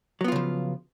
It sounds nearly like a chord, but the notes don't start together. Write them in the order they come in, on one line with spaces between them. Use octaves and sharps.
F#3 B3 F4 C#3 F3